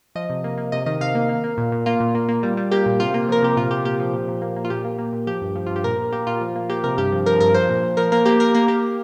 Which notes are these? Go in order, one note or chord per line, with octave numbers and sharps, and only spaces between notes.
F3 D#5
C3
A#3
A#3
C3 D#5
D#3 D#5
C3 F5
A#3
A#3
A#3
A#2
A#2
A#3 F4
A#2
A#3
A#3
G3
G3
A#3 G4
A#2
C3 F4
A#3 F4
F3 A#4
C3 G4
A#2 F4
A#2 G4
A#3 G4
F3
A#2
A#2
A#3
A#3
F4
A#2 G4
A#3
A#3
A#2
F3 G4
G2
F3
G2 F4
G4
A#2 A#4
A#2
A#3 G4
A#2 F4
F3
A#3
A#3 G4
C3 A#4
G2 G4
F3
F3 A#4
G2 A#4
F3 C5
A#2
A#2
F3 A#4
A#3 A#4
A#3 G4
A#3 A#4
A#3 A#4
A#3 G4